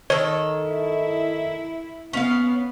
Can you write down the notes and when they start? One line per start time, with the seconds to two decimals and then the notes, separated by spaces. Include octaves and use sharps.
0.10 D#3 A4 C#5
0.66 E4
2.13 B3 C#4 F5